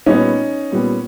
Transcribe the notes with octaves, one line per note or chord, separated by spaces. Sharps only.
A#2 G3 B3 C#4 D#4
A#2 G3 B3